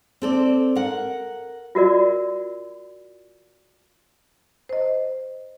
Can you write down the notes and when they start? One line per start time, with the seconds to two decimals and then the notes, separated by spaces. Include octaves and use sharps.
0.22 C4 A4 D5
0.75 A#4 F#5
1.75 F4 F#4 A#4 D5
4.69 C5 D#5